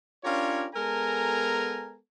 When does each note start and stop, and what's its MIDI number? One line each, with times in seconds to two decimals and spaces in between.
0.24 0.67 61
0.24 0.67 62
0.24 0.67 65
0.24 0.67 67
0.24 0.67 70
0.24 0.67 73
0.74 1.96 56
0.74 1.96 59
0.74 1.96 69
0.74 1.96 70
0.74 1.96 80
0.74 1.96 82